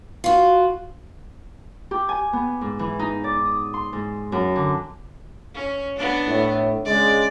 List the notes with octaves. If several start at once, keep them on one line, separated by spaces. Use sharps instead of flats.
F4 F#4
G4
G#5
B3
G#2
E3
D#4
D5
D#6
C6
G#2
F#2
D3
C#4
B3 D4
A2
C#3 G#3 D5